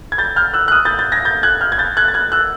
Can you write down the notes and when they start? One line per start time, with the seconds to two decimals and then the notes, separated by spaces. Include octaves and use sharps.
0.12 G#6
0.18 G6 A6
0.36 F6 G6
0.53 E6 F#6
0.68 F#6
0.71 D#6 F6
0.85 G6 A6
0.99 G6 A6
1.12 G#6 A#6
1.25 G6 A6
1.43 F#6 G#6
1.61 F6 G6
1.72 G#6
1.78 G6 A6
1.97 F#6 G#6
2.08 A6
2.14 F#6 G#6
2.32 E6 F#6